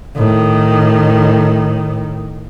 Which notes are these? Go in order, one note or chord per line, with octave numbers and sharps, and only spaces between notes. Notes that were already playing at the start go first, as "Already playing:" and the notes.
A2 D#3